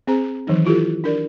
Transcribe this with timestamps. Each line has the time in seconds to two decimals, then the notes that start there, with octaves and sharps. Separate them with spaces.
0.07 C4 G#4 C5 A#5
0.47 D#3 E3 F#3 D#4
0.65 E4 F4 G4 A4
1.04 D4 A#4 D5